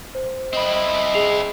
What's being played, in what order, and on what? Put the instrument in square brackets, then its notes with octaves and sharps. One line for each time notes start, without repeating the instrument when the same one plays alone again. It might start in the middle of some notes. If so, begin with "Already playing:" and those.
[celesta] C5
[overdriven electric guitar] C4 E4 [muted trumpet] D#5
[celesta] G#4 C7 F7